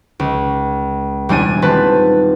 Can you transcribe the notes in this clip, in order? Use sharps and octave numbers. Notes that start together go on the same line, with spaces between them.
C#2
E1 G3 D4 G#5 D#7
D#1 C4 B4 A5